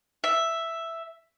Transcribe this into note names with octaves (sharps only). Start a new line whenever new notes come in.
E5